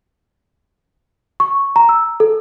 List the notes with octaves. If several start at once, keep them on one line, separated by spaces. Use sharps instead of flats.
C#6
A#5
E6
A4